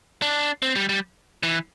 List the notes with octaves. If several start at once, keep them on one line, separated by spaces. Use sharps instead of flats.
D4
C4
G3
G3
E3